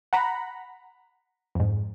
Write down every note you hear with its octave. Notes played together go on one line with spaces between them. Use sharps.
F#5 A#5 B5
F2 G#2